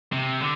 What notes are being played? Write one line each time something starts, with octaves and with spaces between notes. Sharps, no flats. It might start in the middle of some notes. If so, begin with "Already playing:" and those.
C3
D3